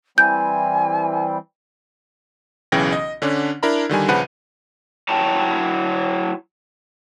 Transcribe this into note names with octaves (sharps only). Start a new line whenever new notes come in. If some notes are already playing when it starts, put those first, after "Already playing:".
E3 G3 C4 G#5 G6
B1 C#3 E3 C#4 G5 A#6
D#5
D3 C#4 D4
D4 E4 A#4 A#5 B5
D3 D#3 G3 G#5
A#1 C#3 F3 B4 F#5 D#7
F#3 E4 C#5 G5 A5 A#5